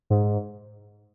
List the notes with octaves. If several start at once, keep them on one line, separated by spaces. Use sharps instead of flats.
G#2